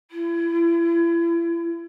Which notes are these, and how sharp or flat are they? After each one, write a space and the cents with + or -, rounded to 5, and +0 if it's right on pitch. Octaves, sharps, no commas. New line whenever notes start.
E4 +35